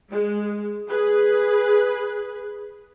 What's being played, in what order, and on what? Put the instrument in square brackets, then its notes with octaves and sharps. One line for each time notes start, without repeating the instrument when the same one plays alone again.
[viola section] G#3
G#4 B4